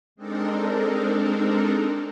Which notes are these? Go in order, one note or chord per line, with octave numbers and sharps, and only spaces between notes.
G#3 C4 D4 D#4 A4 A#4